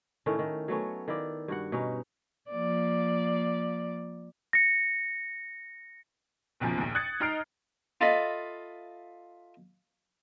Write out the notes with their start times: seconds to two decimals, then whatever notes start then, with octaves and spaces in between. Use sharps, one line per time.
0.26 A2 D#3 A3 C#4
0.39 D#3
0.68 F#3 A3 B3 C#4
1.08 D#3 E4 D5
1.48 G2 F#4 F#5
1.72 B2 C#4 D#4
2.50 F3 A#3 D5
4.53 A#6 C#7
6.60 F#1 B1 F#2 F3
6.78 A#1 D#2
6.95 D#6 F#6 G#6 A6 C#7
7.20 D#4 D#5 A#5 F6 C7 D7
8.01 F4 A4 D#5 E5 B5